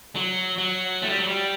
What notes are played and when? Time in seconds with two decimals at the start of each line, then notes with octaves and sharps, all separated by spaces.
0.16 F#3
0.58 F#3
1.02 A3
1.09 G3
1.18 F#3
1.27 G3